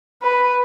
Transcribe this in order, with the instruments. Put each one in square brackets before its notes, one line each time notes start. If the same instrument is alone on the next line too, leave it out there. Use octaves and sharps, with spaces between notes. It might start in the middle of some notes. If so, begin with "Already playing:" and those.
[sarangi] B4